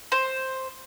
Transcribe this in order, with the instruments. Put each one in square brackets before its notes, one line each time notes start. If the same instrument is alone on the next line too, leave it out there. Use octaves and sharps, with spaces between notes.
[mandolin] C5